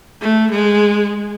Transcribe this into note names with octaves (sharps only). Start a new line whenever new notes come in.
A3
G#3